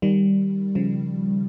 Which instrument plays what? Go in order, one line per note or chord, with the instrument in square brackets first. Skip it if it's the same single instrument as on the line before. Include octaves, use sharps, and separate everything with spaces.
[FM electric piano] D#3 G3
C#3 F3